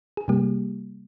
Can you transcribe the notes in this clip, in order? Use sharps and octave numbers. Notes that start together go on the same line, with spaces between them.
G#4
C3 G3 A#3 G4